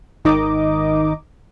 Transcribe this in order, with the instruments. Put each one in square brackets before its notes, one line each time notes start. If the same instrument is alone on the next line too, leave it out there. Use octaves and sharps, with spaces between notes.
[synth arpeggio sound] G#1 D#3 D#4 D#5 D6